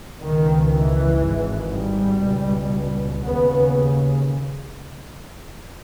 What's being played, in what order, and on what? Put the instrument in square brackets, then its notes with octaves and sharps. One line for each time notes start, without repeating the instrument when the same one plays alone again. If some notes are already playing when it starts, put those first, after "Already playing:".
[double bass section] C#2 B2 D#3
E3
G#1 G#2
G3
C#2 B2
D#2 C#3 B3